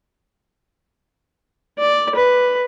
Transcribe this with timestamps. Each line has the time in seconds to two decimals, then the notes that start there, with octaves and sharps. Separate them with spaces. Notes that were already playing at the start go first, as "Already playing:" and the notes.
1.79 D5
2.15 B4